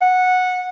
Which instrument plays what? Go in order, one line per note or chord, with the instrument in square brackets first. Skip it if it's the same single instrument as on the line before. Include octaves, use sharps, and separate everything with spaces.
[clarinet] F#5